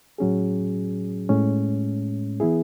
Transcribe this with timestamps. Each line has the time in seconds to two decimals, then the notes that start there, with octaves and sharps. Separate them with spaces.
0.18 A2 F#3 C#4 G#4
1.29 A2 G#3 C#4
2.40 E3 B3 E4 G#4